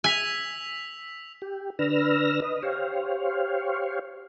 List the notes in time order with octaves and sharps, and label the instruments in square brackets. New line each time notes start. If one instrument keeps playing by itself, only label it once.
[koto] G#5 [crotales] E6 B6 F7
[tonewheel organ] G4
D3 D4 B4 E6 F6 A#6
B4 D#5
G4 C5 C#5 F5